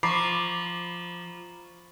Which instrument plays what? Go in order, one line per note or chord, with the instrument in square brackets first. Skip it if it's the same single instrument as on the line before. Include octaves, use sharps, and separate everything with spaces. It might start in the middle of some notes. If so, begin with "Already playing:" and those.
[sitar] F3 [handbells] A#5 C#6 [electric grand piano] B5 D6 C7